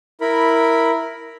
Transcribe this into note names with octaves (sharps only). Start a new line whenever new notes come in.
E4 A#4 B5